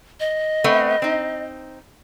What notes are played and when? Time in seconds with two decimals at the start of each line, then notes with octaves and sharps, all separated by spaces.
0.20 D#5
0.64 A3 B3 C4
1.02 C4 D#4